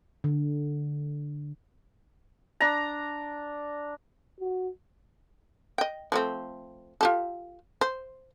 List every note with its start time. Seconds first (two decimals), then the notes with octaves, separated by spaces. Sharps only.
0.24 D3
2.60 D4 A#5
4.40 F#4
5.78 D#5 G5
6.12 F3 A3 C4
7.01 F4 G4 A4
7.81 C5